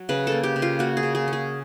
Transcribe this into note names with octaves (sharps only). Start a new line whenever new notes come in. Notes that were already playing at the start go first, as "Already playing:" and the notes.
Already playing: F#3
C#3 B4
A#3 A4
G4
C#3
F4
A#3 F#4
G#4
C#3
G#4
C#4
G#4